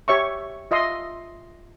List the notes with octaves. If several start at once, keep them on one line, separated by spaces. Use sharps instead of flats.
G4 C#5 E5 C#6
F4 D#5 E5 C6